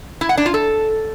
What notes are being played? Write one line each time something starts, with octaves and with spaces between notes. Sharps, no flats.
E4
F#5
D4
F4
A4